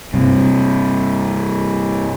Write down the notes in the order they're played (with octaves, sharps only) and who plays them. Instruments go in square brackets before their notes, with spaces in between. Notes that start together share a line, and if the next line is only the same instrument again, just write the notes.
[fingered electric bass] G2 C3